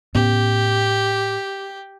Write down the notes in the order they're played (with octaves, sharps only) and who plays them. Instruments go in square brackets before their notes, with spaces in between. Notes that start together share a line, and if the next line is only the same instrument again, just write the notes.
[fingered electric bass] A2 B3 C#4 [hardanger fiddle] G4